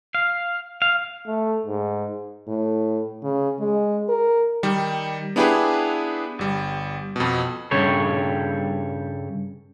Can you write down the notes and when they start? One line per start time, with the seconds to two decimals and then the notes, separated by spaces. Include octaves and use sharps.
0.15 F5
0.82 F5
1.27 A3
1.66 G#2
2.48 A2
3.23 C#3
3.60 G#3
4.09 A#4
4.63 D#3 G3
5.36 B3 D4 E4 G4 G#4 B4
6.39 G1 G3
7.16 F2 B2
7.71 G2 C#3 G4 A4 C#5